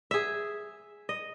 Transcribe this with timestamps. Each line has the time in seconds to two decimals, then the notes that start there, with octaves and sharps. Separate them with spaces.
0.11 G#4 E5
1.09 D#5